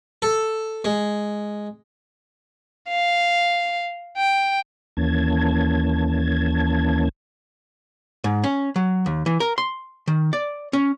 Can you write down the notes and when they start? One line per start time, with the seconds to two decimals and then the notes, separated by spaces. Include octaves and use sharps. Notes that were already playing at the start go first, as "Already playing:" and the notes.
0.22 A4
0.85 G#3
2.89 F5
4.17 G5
4.97 D#2 E3 A#3 C#4 A5 G#6
8.24 G#2
8.44 C#4
8.76 F#3
9.06 D#2
9.26 E3
9.40 A#4
9.58 C6
10.08 D#3
10.33 D5
10.73 C#4